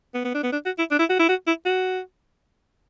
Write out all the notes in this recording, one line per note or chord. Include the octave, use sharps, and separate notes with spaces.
B3
B3
D4
B3
D4
F#4
E4
D4
E4
F#4
E4
F#4
E4
F#4